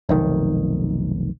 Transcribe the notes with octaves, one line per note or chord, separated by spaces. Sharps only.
F1 B1 D#3